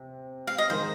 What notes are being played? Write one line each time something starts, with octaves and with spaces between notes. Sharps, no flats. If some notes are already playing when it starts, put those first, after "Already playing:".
Already playing: C3
F5
D#5
D#3 G#3 D#4 A#4 C5